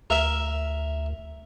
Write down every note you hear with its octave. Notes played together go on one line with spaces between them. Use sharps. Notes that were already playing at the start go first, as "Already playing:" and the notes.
D2 A#4 E5